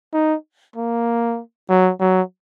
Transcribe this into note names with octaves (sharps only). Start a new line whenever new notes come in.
D#4
A#3
F#3
F#3